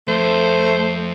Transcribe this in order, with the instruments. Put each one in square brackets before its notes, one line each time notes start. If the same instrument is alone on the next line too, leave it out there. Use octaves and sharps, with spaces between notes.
[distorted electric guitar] F2 [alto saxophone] A3 [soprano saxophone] C5